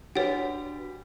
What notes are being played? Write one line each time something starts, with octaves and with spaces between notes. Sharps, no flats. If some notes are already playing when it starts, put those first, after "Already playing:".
D4 F#4 G4 B4 C#5 F#5